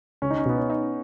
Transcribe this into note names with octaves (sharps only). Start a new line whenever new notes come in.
C#2 C#4
D#4
C#4
B2 B3
C#4
D#4